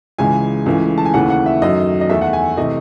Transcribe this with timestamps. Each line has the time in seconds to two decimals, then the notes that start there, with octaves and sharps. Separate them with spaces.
0.19 C#2 C#3 E3 G#3 G#5
0.66 C#2 C#3 E3 A3
0.98 A5
1.05 G#5
1.14 D#2 C#3 E3 A3 F#5
1.30 F#5
1.46 E5
1.62 F#2 D#3 F#3 A3 D#5
2.01 D#5
2.09 E2 D#3 A3 E5
2.21 F#5
2.33 G#5
2.57 C3 E3 A3 D#5